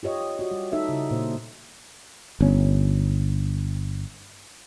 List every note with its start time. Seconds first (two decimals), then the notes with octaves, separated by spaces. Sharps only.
0.03 F4 G4 C#5 D#5
0.39 F#4 D5
0.51 G3
0.72 D#4 A4 E5
0.89 C#3 E4
1.11 A#2 C5
2.41 G1 C#4